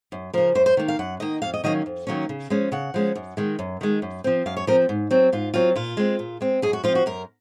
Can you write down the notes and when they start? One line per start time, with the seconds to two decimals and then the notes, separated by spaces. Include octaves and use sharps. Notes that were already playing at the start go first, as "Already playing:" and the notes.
0.12 F#2
0.33 C#3 F3 A#4
0.55 F#2 C5
0.66 C5
0.77 D#3 A#3
0.88 F5
0.99 F#2 F#5
1.20 D#3 A#3 D#5
1.42 F2 F5
1.54 D#5
1.64 D#3 F#3 A#3 C#4 D#5
1.86 F2
2.07 D#3 F#3 A#3 C#4
2.29 C#3
2.50 F3 G#3 C#4
2.72 C#3 F#5
2.94 F3 G#3 C#4
3.15 F#2
3.37 D#3 G#3
3.59 F#2
3.81 D#3 G#3
4.02 F#2
4.24 F3 C4
4.46 F#2 F5
4.57 C#5
4.67 F3 C4 A#4
4.89 G#2
5.11 F#3 C4
5.33 G#2 F4
5.54 F#3 C4 F4
5.76 A#2 F4
5.97 G#3 C4
6.19 A#2
6.41 G#3 C4
6.62 F#2 G#4
6.73 F#4
6.84 F3 F4
6.88 C4
6.95 F#4
7.06 F#2 A#4